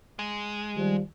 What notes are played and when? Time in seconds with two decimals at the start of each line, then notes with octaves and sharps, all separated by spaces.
0.19 G#3
0.75 D#3 F3 G3